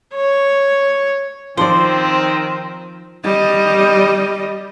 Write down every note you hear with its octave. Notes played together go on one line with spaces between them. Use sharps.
C#5
D#3 F3 C4 C5 D5
G3 D#5